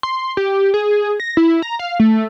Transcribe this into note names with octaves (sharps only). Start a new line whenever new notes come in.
C6
G4
G#4
A#6
E4
A#5
F5
A3